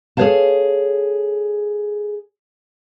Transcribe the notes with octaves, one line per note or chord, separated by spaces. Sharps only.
G#4 A4 C5 C#5 F5 A5